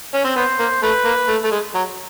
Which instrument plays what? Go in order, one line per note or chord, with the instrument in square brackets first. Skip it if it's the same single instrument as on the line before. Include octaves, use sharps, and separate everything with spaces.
[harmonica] C#4
C4
[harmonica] B3 [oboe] C5
[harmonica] A#3
[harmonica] A3 [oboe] B4
[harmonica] A#3
A3
A3
G#3
F#3